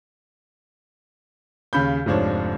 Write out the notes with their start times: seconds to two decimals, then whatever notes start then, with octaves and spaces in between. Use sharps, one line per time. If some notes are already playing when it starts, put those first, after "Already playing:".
1.73 D#2 C#3 B5 G6
2.06 F1 G#2 F3 D4 C#5